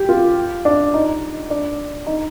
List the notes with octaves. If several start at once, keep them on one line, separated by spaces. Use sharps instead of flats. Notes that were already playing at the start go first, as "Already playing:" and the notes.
Already playing: G4
F4
D4
D#4
D4
D#4